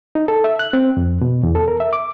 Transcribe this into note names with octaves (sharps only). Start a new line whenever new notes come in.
D#4
A4
E5
F#6
C4
F2
B2
E2
A4
A#4
E5
D6